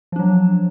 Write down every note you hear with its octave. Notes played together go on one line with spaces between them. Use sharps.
F3 F#3 D4